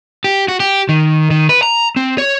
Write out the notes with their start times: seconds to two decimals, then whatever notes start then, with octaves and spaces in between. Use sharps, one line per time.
0.24 G4
0.48 F#4
0.60 G4
0.89 D#3
1.31 D#3
1.49 B4
1.63 A#5
1.96 C4
2.18 C#5